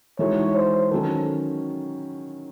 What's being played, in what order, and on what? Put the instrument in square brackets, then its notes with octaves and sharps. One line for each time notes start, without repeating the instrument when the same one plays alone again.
[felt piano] E3 G#3 D#4 F#4 A4 [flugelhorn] C#5
[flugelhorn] C5
[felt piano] D#3 F#3 C#4 [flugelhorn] A4